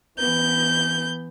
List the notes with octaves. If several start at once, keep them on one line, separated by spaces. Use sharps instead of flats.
E3 B3 G6